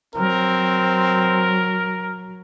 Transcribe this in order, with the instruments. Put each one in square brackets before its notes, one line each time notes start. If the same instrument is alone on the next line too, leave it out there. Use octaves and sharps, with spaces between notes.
[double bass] F#3 [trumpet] C4 [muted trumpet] A#4